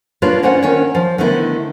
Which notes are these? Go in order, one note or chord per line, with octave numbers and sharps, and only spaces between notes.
A#3 D4 F4 B4 C#5 D5
A#3 C#4 C5 D5 F#5
D#3 C#4 D4 C#5
F3
D3 D#3 A3 B3 E4